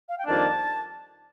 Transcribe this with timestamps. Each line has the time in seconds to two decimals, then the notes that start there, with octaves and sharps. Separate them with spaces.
0.09 F5
0.18 G5
0.26 F2 D#3 G3 A#3 D4 A5